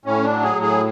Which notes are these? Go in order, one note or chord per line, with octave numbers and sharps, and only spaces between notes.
A2 C#4
D4
F#3
G#4
A2
G#4